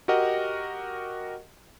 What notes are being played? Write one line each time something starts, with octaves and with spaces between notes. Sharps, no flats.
F#4 G4 A#4 D#5 F#5